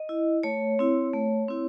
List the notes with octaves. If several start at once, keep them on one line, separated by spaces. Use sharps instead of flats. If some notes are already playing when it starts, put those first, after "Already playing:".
Already playing: D#5
E4
A3 C#5
C4 E4
A3
C4 E4